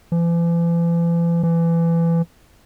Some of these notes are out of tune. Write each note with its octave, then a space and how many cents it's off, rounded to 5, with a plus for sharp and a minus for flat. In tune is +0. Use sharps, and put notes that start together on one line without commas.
E3 +45
E3 +25